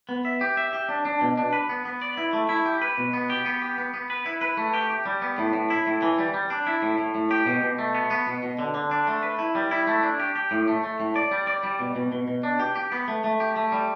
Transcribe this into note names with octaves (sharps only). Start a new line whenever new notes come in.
B3
E5
G4
E5
G4
D4
D4
B2
D4
B4
B3
B3
D5
E4
A3
E4
G4
B4
B2
B3
G4
B3
G4
B3
B3
B4
E4
B4
A3
G4
G4
G3
B3
A2
A2
E4
A2
E3
G3
G3
D4
E4
A2
A2
A2
G4
B2
B2
A3
B3
B3
B2
B2
D3
D3
D4
A3
B4
E4
G3
E4
A3
D4
G4
G4
A2
A3
A3
A2
D5
G3
D5
G3
B2
B2
B2
B2
D4
G4
G4
B3
A3
A3
G4
A3
G3